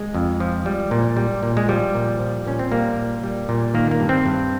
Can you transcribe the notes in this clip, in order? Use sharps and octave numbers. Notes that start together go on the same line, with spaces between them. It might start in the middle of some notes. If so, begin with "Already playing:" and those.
Already playing: G#3
F2
F3
G3
A#2
G3
A#2
G#3
F3 G3
A#2
F3
A#2 C#4
C4
G3 A#3
A#2
G3
A#2
D#3 A#3
A#3
G2
C4
G2